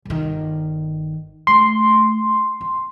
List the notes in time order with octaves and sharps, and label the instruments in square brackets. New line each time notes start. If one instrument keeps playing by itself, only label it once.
[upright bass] G1 D#3
[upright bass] A3 [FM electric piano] C6
[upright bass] B3